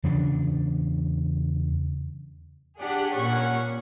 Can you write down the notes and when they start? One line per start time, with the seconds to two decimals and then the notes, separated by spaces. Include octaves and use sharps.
0.04 E2 C#3 D4
2.79 D4 G4 G#4 F#5
3.12 A#2 C#4 F#5 C#6